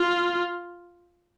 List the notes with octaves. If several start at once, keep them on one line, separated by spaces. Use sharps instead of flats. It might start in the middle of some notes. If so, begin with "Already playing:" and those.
Already playing: F4